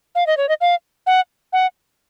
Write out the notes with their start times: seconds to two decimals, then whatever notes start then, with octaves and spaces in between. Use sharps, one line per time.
0.15 F5
0.27 D#5
0.37 C#5
0.49 D#5
0.61 F5
1.06 F#5
1.53 F#5